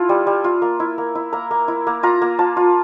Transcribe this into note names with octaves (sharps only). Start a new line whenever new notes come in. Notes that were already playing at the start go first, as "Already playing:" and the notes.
Already playing: E4 F4 A5
G3
G3
F4
A#3
E4
A#3
E4
A#3 A#5
A#3
E4
A#3
F4 A#5
A#3
F4 A5
F4